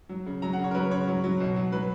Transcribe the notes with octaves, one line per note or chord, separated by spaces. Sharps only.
F#3
C#3
F#3 A#5
F#5
C#3
C#5
A#4
F#3 B4
C#3 C#5
F#3
F#3
B2
F#3
F#3 B4